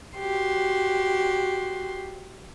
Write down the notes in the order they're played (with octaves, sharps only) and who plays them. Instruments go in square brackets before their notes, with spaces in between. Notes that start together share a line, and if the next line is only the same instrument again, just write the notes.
[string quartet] F#4 G4 C6